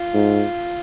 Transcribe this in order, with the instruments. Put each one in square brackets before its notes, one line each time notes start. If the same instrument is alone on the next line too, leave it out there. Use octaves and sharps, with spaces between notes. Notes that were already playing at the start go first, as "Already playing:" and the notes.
Already playing: [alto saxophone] F4
[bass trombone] G#2